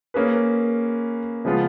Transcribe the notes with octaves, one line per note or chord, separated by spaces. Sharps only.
A#3 C#4 G#4 B4
C#3 F3 G#3 B3 F4